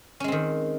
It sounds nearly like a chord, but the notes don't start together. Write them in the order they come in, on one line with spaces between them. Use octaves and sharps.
C#4 G#3 C4 D#3